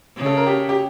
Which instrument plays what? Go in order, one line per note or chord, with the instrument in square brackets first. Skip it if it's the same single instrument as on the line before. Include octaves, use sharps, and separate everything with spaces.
[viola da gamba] C#3
[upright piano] A4
A#4
G4
G4